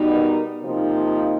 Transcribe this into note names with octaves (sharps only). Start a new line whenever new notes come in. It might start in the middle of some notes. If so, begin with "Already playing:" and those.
Already playing: B2 G3 B3 D#4
A#4
C3 F3 A#3 D#4